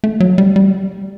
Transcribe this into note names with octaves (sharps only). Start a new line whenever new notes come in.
A3
F#3
G3
G3